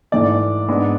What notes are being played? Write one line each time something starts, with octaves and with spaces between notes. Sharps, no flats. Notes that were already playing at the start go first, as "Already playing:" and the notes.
G#2 E3 A3 D5
G#2 G#3 B3 D4